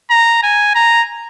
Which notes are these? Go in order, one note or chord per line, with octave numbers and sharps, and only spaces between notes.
A#5
G#5
A#5